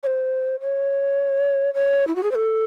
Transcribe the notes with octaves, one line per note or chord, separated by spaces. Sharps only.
C#5
C5
C#5
C#5
E4
F#4
G#4
C5
A4